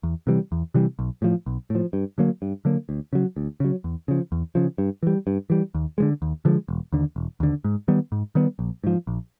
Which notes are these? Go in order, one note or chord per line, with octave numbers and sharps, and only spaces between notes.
E2
C3 E3 G3
E2
C3 E3 G3
B1
A2 F3
B1
A2 F3
G2
D3 F#3 A#3
G2
D3 F#3 A#3
D2
C#3 F#3
D2
C#3 F#3
E2
C#3 F3
E2
C#3 F3
G2
E3 G3
G2
E3 G3
D#2
D3 F3 G#3
D#2
D3 F3 G#3
E1
D#2 D3
E1
D#2 D3
G#2
D#3 G3 B3
G#2
D#3 G3 B3
A#1
G#2 F3
A#1